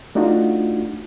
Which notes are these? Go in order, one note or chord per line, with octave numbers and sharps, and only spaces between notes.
A3 D4 D#4 F4 F#4